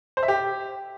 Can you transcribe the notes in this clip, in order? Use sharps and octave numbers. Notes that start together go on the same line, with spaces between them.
C5
E5
G4